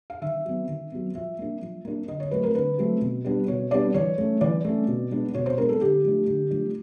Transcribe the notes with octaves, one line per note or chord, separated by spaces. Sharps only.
F5
D#3 E5
F#3 B3
D#3
F#3 B3
F3 E5
A#3 D4
F3
A#3 D4
D3 D#5
C#5
F#3 A3 C4 B4
A#4
D3 B4
F#3 A3 C4
B2
G3 B3 D4
B2 C#5
G3 B3 D4 D5
E3 C#5
A3 C#4
E3 D5
A3 C#4
B2
G#3 B3 D4
B2 C#5
C5
G#3 B3 D4 A#4
A4
D3 G4
F3 A3 D4
D3
F3 A3 D4